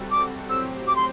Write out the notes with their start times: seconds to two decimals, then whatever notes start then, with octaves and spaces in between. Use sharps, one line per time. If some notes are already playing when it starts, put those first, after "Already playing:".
Already playing: C3 G3 C4 F#4 A4
0.11 D6
0.49 A2 F#3 C4 G4 C5 E6
0.87 D6
0.96 C6